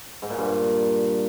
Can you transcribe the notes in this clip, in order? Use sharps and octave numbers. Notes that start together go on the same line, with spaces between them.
G#2
A#2
G2